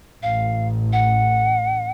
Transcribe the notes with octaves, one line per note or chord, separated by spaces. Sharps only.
A1 F5
F#5